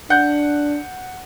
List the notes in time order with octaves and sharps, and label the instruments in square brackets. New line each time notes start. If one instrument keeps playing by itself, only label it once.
[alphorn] D4 [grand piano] F#5 G6